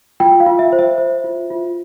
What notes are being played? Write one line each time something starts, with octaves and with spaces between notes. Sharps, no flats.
F4 G5
F5
F4
E5
C5
E5
C5
F4
F4